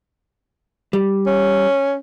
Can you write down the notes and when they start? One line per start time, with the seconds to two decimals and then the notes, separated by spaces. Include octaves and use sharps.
0.93 G3
1.27 C#4